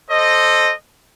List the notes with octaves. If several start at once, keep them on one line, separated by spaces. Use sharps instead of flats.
A4 C5 D#5